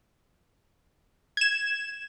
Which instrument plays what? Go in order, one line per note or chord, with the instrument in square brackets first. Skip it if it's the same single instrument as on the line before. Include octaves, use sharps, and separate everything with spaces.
[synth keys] G#6 E7